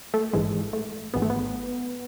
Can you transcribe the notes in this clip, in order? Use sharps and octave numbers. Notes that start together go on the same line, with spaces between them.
A3
A1 G#2 E3 G#3
A3
G#1 G#2 E3 B3
A3
B3